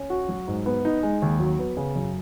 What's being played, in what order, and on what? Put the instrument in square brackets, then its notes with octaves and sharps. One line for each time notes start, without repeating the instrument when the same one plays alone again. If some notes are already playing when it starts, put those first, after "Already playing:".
Already playing: [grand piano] C#4
F#4
F#3
G#2
B3
D#4
G#3
D#2
F#3
B3
C#3
F#2